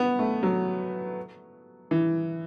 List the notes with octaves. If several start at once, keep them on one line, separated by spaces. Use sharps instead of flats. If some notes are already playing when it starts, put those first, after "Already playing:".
Already playing: B3
A3
F#3
E3